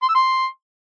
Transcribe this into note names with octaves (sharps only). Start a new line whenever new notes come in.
C6
E6
C6